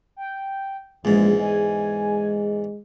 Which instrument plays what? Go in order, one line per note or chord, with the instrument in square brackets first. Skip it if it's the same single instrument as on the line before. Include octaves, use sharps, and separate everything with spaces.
[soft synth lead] G5
[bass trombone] A#1 [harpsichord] E2 G#2 [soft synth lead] G#3
[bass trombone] G#3 [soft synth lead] G#5